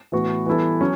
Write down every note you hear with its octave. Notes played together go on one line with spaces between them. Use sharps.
A2 E3 B3 F#4
E3 G3 B3 E4 A4
F#3 C#4